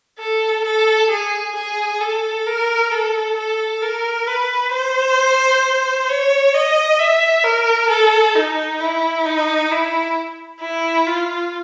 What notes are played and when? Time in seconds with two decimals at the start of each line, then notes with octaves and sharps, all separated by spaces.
0.19 A4
0.64 A4
1.10 G#4
1.56 G#4
2.00 A4
2.46 A#4
2.91 A4
3.36 A4
3.82 A#4
4.27 B4
4.72 C5
6.09 C#5
6.53 D#5
6.99 E5
7.44 A#4
7.89 A4
8.35 D#4
8.80 E4
9.25 D#4
9.71 E4
10.61 E4
11.06 F4